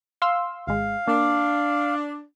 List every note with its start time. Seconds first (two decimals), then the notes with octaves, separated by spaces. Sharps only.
0.22 F5 C6 E6
0.67 G#1 G#3 F5
1.08 A#3 D4